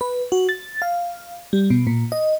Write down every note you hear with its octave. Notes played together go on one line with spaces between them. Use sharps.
B4
F#4
A6
F5
G3
B2
A#2
D#5